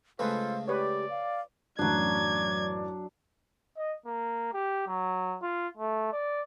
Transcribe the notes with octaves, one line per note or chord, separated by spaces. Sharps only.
C#3 G#3 A3 F4 A4 B4 C5 F5
G4 B4 C#5 D5
F5
A1 F#2 F#3 D4 D5 G#6
D#5
A#3
G4
F#3
F4
A3
D5